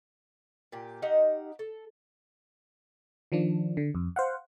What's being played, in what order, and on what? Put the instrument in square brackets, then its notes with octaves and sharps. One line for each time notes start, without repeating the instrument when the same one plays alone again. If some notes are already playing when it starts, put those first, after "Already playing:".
[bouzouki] A#2 G4
D#4 G4 F5 F#5
A4
[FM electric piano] D#3 F3 D4
D3
F2
C5 F5 F#5